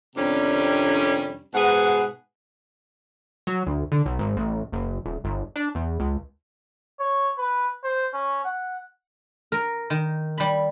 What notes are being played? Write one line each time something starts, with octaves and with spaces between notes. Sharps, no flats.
F2 C3 D#3 G3 C#4 D4
G#2 B2 G#4 B4 F#5
F#3
D2
D3
B1
G#1
A1
F#1
D#1
G1
D4
E2
C#2
C#5
B4
C5
C#4
F#5
A#4
D#3
G3 B5